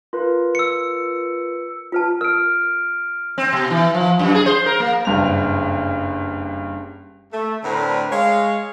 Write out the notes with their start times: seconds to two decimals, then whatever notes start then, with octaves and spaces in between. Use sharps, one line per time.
0.13 F4 A#4 B4
0.55 E6 C#7
1.92 F4 B4 A5
2.21 A#4 F6 D7
3.38 C4
3.53 B2
3.70 E3
3.94 F3
4.19 F#2
4.35 G#4
4.46 C5
4.66 A#4
4.80 A#3
5.05 F#1 G2 F7
7.32 A3
7.64 A2 D3 C4 D4 A#4 B4
8.11 G#3 C#5 F5